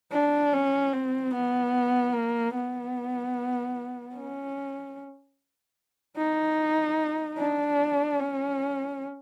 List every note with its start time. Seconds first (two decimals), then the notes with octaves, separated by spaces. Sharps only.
0.12 D4
0.53 C#4
0.93 C4
1.33 B3
2.14 A#3
2.55 B3
4.16 C#4
6.18 D#4
7.38 D4
8.19 C#4